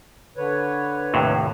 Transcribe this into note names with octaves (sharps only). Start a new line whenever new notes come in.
D3 B4 C#5
D#2 A2 C3